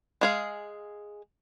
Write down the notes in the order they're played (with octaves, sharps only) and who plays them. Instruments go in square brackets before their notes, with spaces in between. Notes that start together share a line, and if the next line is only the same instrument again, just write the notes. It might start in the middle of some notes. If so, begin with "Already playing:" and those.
[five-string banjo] G#3 G#4 F5